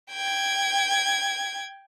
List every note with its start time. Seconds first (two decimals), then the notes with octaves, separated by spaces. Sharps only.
0.11 G5 G#6